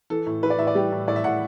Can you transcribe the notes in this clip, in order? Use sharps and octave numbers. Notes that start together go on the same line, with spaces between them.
E3 A4
A2
E3 B4
D5
A2 E5
D5
G3 G4
A2
A2 D5
E5
A2 F#5